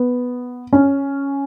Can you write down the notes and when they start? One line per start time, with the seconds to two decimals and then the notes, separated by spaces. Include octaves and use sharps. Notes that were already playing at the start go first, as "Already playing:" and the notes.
Already playing: B3
0.73 C#4